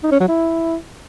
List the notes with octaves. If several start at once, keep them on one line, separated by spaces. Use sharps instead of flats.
D#4
C#4
F#3
E4